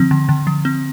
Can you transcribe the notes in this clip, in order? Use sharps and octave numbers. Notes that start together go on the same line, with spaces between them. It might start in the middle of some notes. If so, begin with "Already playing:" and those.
Already playing: D3 F3 C4
D3
D3
F3
C4